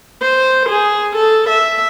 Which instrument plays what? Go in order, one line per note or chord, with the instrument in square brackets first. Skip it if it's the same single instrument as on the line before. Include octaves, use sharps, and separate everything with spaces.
[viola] C5
G#4
A4
E5